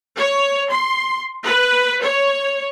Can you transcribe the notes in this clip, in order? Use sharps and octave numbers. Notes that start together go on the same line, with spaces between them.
C#5
C6
B4
C#5